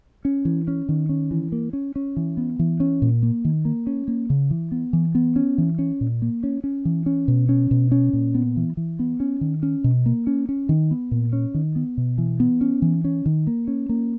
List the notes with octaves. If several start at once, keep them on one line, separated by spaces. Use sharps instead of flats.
C#4
E3
C#4
D#3
C#4
E3
A#3
C#4
C#4
E3
B3
E3
C#4
A#2
A#3
D#3
A#3
C#4
A#3
C#3
E3
B3
E3
B3
C#4
E3
C#4
A#2
A#3
C#4
C#4
E3
C#4
B2
C#4
B2
C#4
A#2
B3
E3
E3
B3
C#4
D#3
C#4
B2
A#3
C#4
C#4
D#3
B3
A#2
C#4
D#3
B3
B2
E3
B3
C#4
E3
C#4
D#3
A#3
C#4
A#3